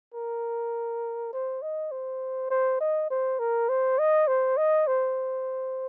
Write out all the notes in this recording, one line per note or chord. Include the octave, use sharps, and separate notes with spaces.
A#4
C5
D#5
C5
C5
D#5
C5
A#4
C5
D#5
C5
D#5
C5